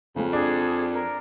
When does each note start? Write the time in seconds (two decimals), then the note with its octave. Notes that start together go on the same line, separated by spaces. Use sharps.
0.16 F2 C#3 F3 G#3
0.33 D4 G#4
0.93 A#4